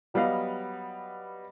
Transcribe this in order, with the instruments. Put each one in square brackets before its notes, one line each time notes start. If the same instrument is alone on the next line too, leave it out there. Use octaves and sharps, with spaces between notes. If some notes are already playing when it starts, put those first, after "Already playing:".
[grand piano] F#3 G3 B3 D#5 F5